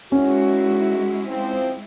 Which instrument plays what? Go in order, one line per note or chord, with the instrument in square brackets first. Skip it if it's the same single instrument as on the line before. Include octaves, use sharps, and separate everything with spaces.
[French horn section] E2 D#3 F#4 [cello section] G#3 E4 [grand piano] C#4
[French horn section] F3 C4